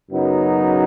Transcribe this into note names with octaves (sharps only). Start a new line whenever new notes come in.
F#2 C#3 F#3 B3 D#4